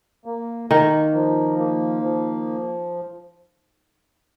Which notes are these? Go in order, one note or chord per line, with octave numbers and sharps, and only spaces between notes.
A#3
D#3 A#3
F3
A#3
F3